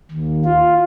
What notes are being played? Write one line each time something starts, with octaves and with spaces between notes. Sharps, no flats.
D#2
F4